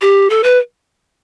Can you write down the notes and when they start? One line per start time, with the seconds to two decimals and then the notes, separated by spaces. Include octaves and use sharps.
0.01 G4
0.30 A4
0.44 B4